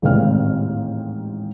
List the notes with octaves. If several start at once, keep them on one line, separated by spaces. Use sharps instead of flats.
A1 D#2 G#2 C4 F5 F6